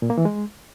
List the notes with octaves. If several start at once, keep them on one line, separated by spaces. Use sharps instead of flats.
A#2
A#3
E3
G#3